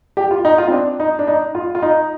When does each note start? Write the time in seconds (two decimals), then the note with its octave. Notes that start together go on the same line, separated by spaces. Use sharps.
0.17 G4
0.31 F4
0.45 D#4
0.58 F4
0.68 C4
0.72 D4
1.00 D#4
1.19 D4
1.27 D#4
1.55 F4
1.75 F4
1.82 D#4